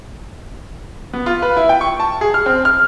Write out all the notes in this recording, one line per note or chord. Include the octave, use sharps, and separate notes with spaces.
B3
F4
B4
E4
G5
C#6
A5
G#4
F6
C4
F6